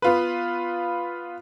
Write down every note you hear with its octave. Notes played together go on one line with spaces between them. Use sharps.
B3 F4 B4